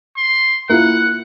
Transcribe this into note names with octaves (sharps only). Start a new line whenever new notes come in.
C6
A#3 E4 F4 F#5